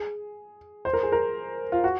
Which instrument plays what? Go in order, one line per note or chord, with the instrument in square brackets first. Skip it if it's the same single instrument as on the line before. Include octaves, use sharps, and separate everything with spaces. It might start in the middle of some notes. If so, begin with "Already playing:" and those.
Already playing: [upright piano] G#4
C5
A#4
G#4
A#4
F4
F#4